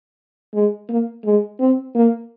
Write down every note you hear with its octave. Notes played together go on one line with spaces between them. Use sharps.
G#3
A#3
G#3
C4
A#3